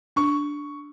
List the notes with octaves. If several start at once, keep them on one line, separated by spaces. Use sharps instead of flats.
D4 C#6